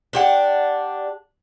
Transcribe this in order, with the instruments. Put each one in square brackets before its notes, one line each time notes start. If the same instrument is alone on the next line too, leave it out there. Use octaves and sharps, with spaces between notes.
[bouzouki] D4 G4 F#5